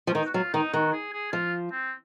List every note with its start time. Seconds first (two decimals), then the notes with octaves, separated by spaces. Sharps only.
0.07 F3 C#4
0.14 D#3 D#4
0.26 F#4
0.34 F#3 F4
0.54 D#3 D#4
0.73 D#3 F#4
0.93 G#4
1.12 G#4
1.32 F3 F4
1.71 C4